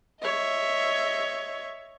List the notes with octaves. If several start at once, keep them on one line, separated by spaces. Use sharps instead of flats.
C#5 D#5 E5